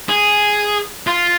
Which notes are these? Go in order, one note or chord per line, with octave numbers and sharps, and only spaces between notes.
G#4
F4